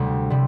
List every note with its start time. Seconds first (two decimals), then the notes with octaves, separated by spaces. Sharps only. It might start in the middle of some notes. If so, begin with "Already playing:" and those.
Already playing: D2 C3 G3
0.30 C3 G3